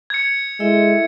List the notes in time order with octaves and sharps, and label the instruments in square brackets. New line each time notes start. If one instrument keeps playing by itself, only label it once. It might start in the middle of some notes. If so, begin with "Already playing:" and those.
[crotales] G#6 C#7
[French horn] G#3 [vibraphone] E4 A4 E5